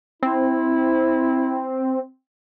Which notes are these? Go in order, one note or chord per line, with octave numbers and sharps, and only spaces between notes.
C4 E4